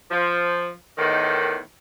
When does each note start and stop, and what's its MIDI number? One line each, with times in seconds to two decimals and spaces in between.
0.11 0.71 53
0.97 1.58 40
0.97 1.58 45
0.97 1.58 51